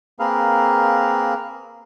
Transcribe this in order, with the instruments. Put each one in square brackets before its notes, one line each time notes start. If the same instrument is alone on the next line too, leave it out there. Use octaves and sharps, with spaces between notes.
[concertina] A#3 C4 G#4 A#4 B4 F5